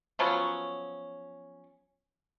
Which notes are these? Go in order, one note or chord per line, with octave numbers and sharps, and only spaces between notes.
F3 F#3 B3 C#4